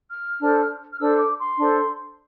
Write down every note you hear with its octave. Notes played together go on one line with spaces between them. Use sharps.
F6
D4 A4 C5
F6
D4 A4 C5 E6
D6
C6
D4 A4 C5